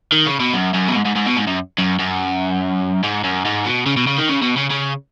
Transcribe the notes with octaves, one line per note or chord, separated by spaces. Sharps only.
D#3
C#3
B2
F#2
F#2
B2
G#2
G#2
G#2
B2
G#2
F#2
F#2
F#2
G#2
F#2
G#2
B2
C#3
B2
C#3
D#3
C#3
B2
C#3
C#3